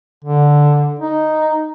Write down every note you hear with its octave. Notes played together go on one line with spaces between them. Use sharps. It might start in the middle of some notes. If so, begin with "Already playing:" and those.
D3
D#4